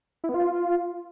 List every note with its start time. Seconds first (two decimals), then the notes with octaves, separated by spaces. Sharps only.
0.24 E4
0.29 B3
0.34 F4